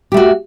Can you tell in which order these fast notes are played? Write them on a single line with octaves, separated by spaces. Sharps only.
G4 A3 F#4